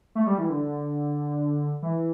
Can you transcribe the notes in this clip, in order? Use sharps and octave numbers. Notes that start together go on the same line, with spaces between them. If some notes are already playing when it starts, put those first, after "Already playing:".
A3
G3
E3
D3
E3